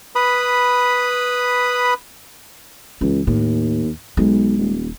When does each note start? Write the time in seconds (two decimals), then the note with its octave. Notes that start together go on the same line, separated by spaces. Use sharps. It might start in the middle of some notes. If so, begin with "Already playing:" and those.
0.16 B4 B5 D#6
3.01 C#2 E3
3.27 D#2 A2
4.17 B1 G#3
4.58 D#1